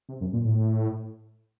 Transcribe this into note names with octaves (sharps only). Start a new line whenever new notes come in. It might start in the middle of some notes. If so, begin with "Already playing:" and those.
C3
F#2
A#2
A2